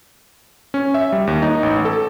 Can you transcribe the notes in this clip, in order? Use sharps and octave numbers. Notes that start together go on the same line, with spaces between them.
C#4
E5
G3
D#2
D#4
A1
A4